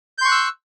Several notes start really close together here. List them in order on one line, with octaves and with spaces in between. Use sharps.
G6 C6 C#6 F#6 E6